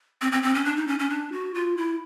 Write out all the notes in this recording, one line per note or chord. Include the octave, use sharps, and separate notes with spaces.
C4
C4
C4
C#4
D4
D#4
C#4
C#4
D4
F#4
F4
E4